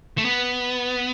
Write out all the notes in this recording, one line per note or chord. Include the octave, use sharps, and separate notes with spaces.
A3
B3